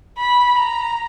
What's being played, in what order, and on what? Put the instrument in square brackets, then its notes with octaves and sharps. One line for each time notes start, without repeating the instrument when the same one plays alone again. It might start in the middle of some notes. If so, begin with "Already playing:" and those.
[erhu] B5
A#5